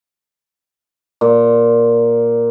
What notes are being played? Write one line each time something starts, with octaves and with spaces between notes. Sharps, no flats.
A#2